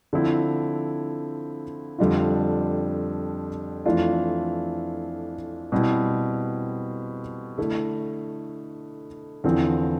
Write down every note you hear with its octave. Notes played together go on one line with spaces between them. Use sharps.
D3 F3 C4 E4
F2 D3 G3 D4 F4
F2 E3 A3 D4 F4
B2 G3 C4 E4
D3 A3 E4
E2 D3 F3 C4 E4